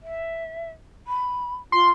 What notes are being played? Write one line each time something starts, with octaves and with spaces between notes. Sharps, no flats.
E5
B5
F4 C6